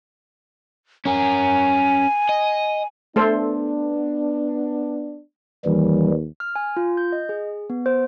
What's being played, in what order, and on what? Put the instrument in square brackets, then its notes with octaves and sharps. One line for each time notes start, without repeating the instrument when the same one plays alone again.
[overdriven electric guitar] C#4 A#4 [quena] G#5
[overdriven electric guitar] D#5
[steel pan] A3 A4 C5 [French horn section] B3 D4
[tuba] D#2 [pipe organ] E3 G3
[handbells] F6
G#5
F4
G6
D#5
G#4
B3
C5